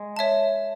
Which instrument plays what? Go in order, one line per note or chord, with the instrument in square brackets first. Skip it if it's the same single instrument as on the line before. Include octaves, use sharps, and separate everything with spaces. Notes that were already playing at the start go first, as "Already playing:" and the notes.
Already playing: [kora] G#3
[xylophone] C#5 E5 A5